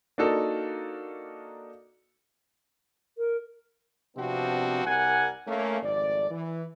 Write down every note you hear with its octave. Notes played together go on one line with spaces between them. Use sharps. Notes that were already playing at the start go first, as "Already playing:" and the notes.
A#3 D4 D#4 F#4 A4 A#4
A#4
C3 F3 B3 C4 D4 F#4
C2 G3 A#4 F#5 G#5
A3 A#3 C#4
G#1 F2 A3 D5
E3